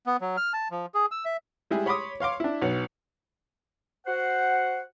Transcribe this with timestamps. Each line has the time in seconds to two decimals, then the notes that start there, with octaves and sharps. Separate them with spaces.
0.07 B3
0.21 F#3
0.37 F6
0.53 A5
0.71 F3
0.95 G#4
1.11 E6
1.25 E5
1.70 G3 G#3 E4 G4 G#4
1.86 C#5 B5 C6 D6 D#6
2.20 C#5 F5 C6 D6
2.40 D4 E4
2.61 B1 B3 F#5
4.06 F#4 C5 F#5